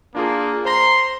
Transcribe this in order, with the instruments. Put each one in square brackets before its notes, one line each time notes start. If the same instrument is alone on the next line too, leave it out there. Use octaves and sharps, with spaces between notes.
[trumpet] A#3 [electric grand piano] D4 F4 G#4
[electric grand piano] C5 A#5 A#6 [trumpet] C6